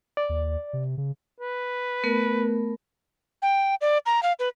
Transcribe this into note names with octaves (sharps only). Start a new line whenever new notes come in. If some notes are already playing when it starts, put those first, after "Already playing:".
D5
D#2
C3
C#3
B4
A3 B3 A#4
G5
D5
A#5
F5
B4